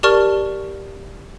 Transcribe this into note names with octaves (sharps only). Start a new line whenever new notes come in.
G4 A#4 D5 A5 C#6 F6